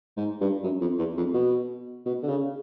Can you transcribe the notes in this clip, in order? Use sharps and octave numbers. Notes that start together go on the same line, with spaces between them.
G#2
G2
F#2
F2
E2
F2
B2
B2
D3
C#3